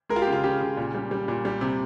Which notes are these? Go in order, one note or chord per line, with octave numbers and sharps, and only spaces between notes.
G#3 A#4
F4
G4
C#3 F4
C#3 G4
C#3
A#2
G3
G3
A#2
G3
C3